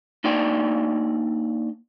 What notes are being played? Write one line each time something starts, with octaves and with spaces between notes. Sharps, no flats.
A#3 D4 D#4 D5 G5